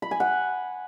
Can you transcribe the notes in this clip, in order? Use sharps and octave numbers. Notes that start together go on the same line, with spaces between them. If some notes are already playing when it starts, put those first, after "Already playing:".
B5
G#5
F#5